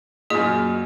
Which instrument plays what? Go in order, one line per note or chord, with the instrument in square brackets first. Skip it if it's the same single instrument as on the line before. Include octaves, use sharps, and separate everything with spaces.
[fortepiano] F#2 A#2 [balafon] G#4 D#5